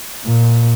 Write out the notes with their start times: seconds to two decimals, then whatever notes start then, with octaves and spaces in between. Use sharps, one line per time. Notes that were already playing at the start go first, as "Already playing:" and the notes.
0.26 A#2